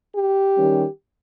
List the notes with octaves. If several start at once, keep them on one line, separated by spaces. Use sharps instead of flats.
G4
D#3 G3 C#4